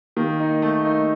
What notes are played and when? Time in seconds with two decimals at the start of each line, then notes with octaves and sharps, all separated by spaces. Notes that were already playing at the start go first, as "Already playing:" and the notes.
0.16 D#3 A#3
0.40 D#4
0.62 A3
0.85 D#4